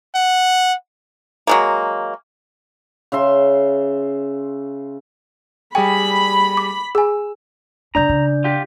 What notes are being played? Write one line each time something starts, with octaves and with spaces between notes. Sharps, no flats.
F#5
F#3 G#3 A#3
C#3 E5 C6
G3 G#4 G5 G#5 B5
D6
G#4 G#5 E6
F#2 C3 D4 D5 A#5 G6
C#3
F4 G4